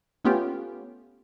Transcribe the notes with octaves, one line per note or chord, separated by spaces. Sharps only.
A3 B3 C#4 F4 G4